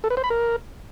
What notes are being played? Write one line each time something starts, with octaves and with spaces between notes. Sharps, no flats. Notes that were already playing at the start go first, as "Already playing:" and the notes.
A4
B4
C5
B5
A#4